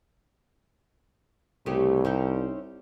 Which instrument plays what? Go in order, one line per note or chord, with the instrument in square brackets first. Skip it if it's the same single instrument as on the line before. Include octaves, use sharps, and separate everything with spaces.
[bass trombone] C2 [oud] C#3 A3 G4
[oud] C4 C#4 D#4